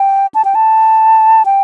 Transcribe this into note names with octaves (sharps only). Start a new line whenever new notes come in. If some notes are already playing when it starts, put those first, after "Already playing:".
Already playing: G5
A5
G5
A5
G5